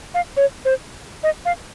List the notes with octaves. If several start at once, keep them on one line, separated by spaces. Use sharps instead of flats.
F5
C#5
C5
D#5
F5